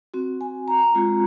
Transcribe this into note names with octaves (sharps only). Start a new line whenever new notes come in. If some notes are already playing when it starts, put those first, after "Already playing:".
C4 F#4
G#5
A#5
G#3 C4 F4